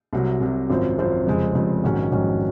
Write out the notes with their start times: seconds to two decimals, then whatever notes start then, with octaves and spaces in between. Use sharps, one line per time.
0.13 C2 C3 F#3
0.40 C2 C3 F#3
0.70 G#1 F#2 F3 C4
0.98 G#1 F#2 F3 C4
1.27 F1 F2 C#3 G#3 C4
1.55 F1 F2 C#3 G#3 C4
1.84 A#1 G#2 D#3 F#3 C#4
2.12 A#1 G#2 D#3 F#3 C#4